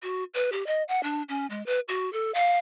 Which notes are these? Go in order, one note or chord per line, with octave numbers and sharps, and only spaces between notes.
F#4
B4
G4
D#5
F#5
D4
C#4
G#3
B4
F#4
A4
F5